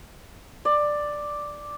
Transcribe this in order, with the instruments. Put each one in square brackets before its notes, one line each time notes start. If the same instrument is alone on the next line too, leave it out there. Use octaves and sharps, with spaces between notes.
[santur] D5